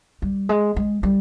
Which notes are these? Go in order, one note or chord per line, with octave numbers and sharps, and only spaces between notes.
G3
G#3
G#3
G3